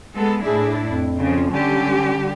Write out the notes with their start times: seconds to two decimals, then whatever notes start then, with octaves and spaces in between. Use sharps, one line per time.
0.17 G#3 B3 A4
0.46 A2 D4 E4 G#4
0.84 F2
1.20 C#3 F3
1.51 D3 G3 C#4 G4